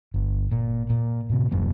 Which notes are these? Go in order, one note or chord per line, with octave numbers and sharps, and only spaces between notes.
G1
A#2
A#2
A2 C3
D#1 F#2 A#3